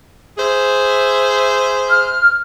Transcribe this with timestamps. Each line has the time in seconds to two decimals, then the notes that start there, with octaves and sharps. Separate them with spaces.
0.38 G#4 C5 E5
1.90 F6